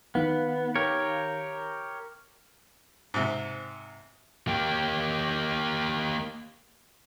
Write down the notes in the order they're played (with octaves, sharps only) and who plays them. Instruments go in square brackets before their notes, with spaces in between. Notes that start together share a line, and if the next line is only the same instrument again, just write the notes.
[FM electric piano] D#3 D#4 F5 [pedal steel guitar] B3
[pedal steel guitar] G4 A#4 C#5
[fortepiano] G#2 C3
[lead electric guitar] A#3 G4